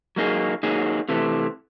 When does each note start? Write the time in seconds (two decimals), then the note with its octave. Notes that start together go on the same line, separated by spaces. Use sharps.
0.16 F#3 A#3 D#4 G#4
0.63 F#3 A#3 D#4 G#4
1.09 C3 E3 A3